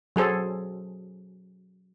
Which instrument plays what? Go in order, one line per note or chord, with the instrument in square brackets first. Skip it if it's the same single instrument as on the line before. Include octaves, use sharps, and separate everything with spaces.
[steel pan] F#3 G#4 A4 C5